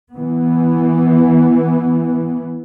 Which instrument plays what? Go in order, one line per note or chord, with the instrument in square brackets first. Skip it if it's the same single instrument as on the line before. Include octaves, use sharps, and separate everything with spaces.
[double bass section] E3 B3